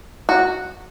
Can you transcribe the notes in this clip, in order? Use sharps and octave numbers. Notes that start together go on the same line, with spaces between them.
F#4